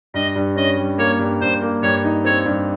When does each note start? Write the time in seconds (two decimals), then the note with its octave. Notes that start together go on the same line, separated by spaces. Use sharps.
0.14 G2 D#5
0.35 G2
0.56 C#4 D#5
0.77 G3
0.98 A#3 C#5
1.19 G2
1.41 G2 C5
1.62 A#3
1.82 G2 C#5
2.04 D#4
2.25 C4 C#5
2.46 G2